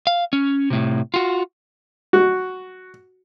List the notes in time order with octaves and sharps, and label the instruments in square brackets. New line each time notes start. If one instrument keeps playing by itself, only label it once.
[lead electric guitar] F5
C#4
A2 C3
F4 F#4
[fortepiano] F#4